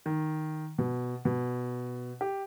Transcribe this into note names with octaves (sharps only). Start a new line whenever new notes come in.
D#3
B2
B2
G4